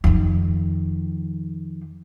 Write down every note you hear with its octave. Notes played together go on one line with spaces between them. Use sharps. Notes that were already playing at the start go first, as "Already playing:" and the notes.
F2 D#3